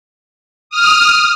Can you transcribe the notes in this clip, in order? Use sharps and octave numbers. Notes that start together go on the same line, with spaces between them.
D#6 F6